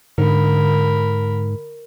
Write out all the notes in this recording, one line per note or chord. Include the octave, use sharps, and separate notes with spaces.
G#2 D3 A#4 B5